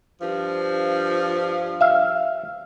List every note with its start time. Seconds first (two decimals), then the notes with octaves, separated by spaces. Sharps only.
0.21 G2 F3
1.81 E5 F5